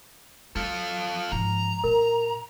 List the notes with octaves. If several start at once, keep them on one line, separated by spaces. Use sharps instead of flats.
F#3 F4 A4
G#2 F3 A#5
A#2 A#4